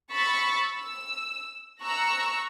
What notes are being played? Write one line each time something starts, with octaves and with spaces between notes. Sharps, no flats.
B5 C#6 E6 A6 B6
E6
A#5 C#6 E6 F#6 A#6